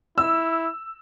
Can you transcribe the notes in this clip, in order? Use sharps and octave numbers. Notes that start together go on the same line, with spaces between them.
E4 E6